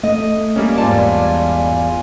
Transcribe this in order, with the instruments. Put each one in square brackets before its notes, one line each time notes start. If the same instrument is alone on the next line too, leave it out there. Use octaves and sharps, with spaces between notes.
[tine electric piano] A3 [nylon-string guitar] D#5
[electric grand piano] G3 A#3 C#4 [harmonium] A#4
[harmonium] E2 F4 G#5 [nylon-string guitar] G#2 A5 [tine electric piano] D5